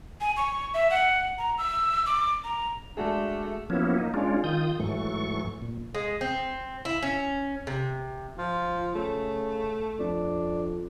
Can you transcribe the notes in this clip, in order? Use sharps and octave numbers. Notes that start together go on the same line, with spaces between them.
G#5
C#6
E5
F#5
A#5
E6
D6
A#5
G#3 A3 D4 F#4 G#4
F3 F#3 A#3 B3 C#4 E4
A#3 D#4
G#3 C#4 D4 F4
D#3 F4 D#6 G6
G#2 E3 F#3 A3 C#6
A#2
G#3
C4
E4
C#4
C3
F3 F4
C#3 A3
F2 D4